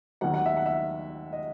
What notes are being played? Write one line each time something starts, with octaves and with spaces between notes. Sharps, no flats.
D#2 D#3 F#3 F#5
F#5
E5
F#5
E5
D#5